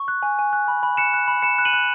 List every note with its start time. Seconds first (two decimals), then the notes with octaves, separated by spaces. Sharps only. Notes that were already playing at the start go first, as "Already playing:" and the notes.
Already playing: C#6
0.08 F#6
0.23 G#5
0.39 G#5
0.53 F#6
0.68 B5
0.83 B5
0.97 F#6 C#7 E7
1.14 F#6
1.28 B5
1.42 B5 C#7 E7
1.58 F#6
1.65 D#7 F#7
1.73 F#6